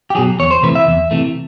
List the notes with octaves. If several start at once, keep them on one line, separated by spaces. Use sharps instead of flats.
G4
B2 F#3 G#4
E2 C#5
C5
C3 E3 A3 B4
E5
E2
C3 E3 A3